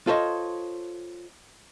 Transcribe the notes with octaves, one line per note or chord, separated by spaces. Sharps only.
F4 A4 C5 C#5 D#5